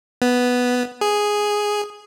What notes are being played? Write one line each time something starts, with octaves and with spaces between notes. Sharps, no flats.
B3
G#4